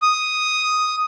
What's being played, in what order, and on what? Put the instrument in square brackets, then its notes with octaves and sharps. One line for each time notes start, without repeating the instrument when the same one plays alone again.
[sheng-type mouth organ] D#6